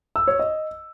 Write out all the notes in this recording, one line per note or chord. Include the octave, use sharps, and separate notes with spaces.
E6
C#5
D#5